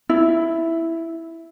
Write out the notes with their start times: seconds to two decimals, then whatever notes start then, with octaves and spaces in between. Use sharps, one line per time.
0.09 E4